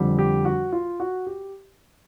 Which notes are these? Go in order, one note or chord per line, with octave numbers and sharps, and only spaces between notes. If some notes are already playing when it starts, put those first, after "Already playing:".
Already playing: F2 D3 G3
G4
F#4
F4
F#4
G4